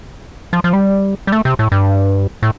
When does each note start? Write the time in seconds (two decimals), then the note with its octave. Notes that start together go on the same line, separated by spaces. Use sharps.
0.53 F3
0.64 F3
0.73 G3
1.27 G3
1.32 A3
1.45 C3
1.59 A2
1.72 G2
2.43 A2